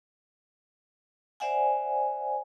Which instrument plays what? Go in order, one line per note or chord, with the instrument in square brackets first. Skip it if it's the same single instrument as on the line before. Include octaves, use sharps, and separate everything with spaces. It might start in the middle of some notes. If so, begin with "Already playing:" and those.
[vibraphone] C5 D5 E5 F#5 G#5